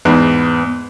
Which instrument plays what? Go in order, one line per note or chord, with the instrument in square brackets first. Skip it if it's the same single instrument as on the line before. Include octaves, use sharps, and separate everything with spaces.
[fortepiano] E2 G#2 [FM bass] B3